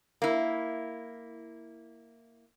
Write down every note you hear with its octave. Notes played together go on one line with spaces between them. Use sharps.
A#3 E4